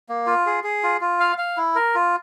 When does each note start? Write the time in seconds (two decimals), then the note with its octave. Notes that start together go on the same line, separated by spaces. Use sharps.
0.09 A#3
0.26 F4
0.46 G#4
0.64 G#4
0.83 F4
1.01 F4
1.20 F5
1.38 F5
1.57 E4
1.75 A#4
1.95 F4